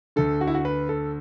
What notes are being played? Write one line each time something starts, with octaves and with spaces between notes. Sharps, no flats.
D2 D3 A4
F#4
E4
F#4
B4
A4